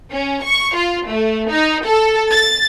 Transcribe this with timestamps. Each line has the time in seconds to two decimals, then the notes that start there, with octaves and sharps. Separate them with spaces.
0.13 C#4
0.44 C#6
0.76 F4
1.09 A3
1.49 D#4
1.86 A4
2.31 A6